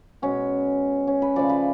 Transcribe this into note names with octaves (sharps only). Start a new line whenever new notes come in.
B2 G#3 C#4
C#4
B4
C#3 F3 A3 D5
B4